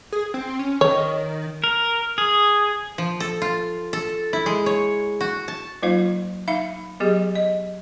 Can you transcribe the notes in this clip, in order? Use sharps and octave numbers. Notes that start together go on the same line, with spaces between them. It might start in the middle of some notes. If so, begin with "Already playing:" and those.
G#4
C4
C#4
D#3 C#5
A#4
G#4
F3
A4
F4
A4
E4
G#3
C#5
F#4
A5
F#3 A#3 D#4 F4 C5 F5
D#4 E5 F5 B5
F#3 B3 G4 G#4 D#5
D#5